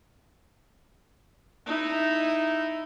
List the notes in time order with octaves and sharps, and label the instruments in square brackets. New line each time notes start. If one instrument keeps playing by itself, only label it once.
[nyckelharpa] D#4 E4